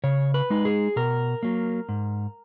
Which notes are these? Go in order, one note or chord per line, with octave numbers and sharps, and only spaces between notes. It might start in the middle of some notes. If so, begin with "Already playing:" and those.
C#3 C#5
B4
G#3 D#4
G#4
B2 A#4
F#3 A#3
G#2